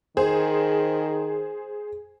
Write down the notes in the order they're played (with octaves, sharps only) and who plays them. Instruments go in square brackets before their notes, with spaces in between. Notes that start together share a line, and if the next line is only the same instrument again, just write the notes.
[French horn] D#3 [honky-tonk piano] G#4 C5